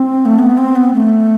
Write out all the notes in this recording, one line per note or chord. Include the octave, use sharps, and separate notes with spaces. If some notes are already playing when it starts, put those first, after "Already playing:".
Already playing: C4
A3
B3
C4
B3
A3